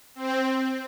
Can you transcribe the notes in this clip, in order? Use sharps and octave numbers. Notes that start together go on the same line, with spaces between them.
C4